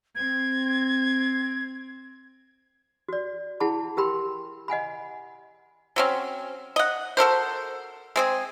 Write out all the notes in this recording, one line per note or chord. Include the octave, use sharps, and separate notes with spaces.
C4 G#6
F#4 D5
E4 G#4 F#5 A5 B5
G4 A#4 G5 B5 C6
D#5 F#5 G#5 B5
F#3 C4 C#4
D#5 F#5
F#4 A4 A#4 C5
G#3 C4 G#4